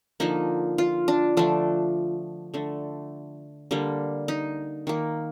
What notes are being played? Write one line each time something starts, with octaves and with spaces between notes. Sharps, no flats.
D3 F3 A#3 D#4
F4
D4
D3 F3 A3 D4
D3 A3
D3 G3 A#3
D#4
D#3 A#3